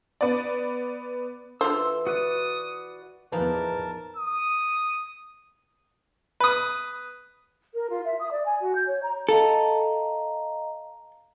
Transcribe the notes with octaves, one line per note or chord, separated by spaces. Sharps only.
B3 D5
D3 E3 F4 C5 E6
F#4 B4 D5 D#6
E2 E3 F3 D#4 A#4 B4 A5
D#6
B4 D#6
A#4
F4
E5
D#6
D5
G#5
F#4
G6
C#5
A#5
A4 D#5 F5 A#5